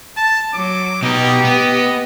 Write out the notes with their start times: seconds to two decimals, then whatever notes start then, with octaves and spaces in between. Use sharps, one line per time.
0.17 A5
0.54 F#3 D6
1.03 B2 D#4 G4
1.44 B3 D#5